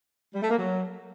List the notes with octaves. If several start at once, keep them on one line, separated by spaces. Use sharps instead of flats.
G3
A3
A#3
F#3